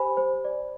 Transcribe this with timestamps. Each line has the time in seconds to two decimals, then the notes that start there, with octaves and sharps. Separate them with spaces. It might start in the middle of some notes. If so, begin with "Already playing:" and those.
Already playing: G4 C5 G#5 B5
0.17 C5
0.45 D5